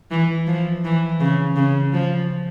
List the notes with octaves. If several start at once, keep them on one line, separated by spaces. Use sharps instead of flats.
E3
F3
E3
C#3
C#3
F3